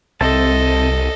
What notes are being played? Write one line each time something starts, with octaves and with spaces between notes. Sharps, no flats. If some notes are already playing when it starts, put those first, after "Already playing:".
C2 C4 A4 D#5 E5 A5